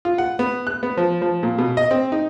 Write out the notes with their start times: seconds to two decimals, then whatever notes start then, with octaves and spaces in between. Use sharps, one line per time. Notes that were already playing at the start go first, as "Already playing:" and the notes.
0.05 F4
0.18 F#5
0.39 B3
0.67 F#6
0.83 B3
0.97 F3
1.22 F3
1.43 A#2
1.58 B2
1.77 D#5
1.91 C4
2.12 D#4